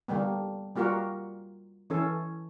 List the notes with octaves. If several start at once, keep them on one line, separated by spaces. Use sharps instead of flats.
D3 G3 A#3 B3
G3 A#3 F4 F#4 A#4
E3 C#4 A4